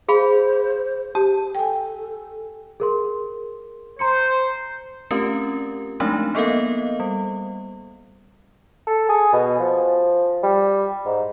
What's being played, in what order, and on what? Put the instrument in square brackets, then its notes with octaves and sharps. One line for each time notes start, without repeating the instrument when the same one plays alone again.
[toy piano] G#4 F5 B5 [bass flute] C5
[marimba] G4 [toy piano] A5
[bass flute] A4 [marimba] G5 G#5
[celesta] G#4 A#4 C6
[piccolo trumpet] C5 [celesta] A#5 C6 C#7
[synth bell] A3 C4 C#4 F4 G4 A#4
F3 G#3 A3 C4 D4 D#4
A#3 B3 A4 A#4 D#5 F5
G3
[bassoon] A4
G#4
B2
F3
G3
G#2